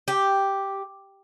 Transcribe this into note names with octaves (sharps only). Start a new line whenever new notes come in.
G4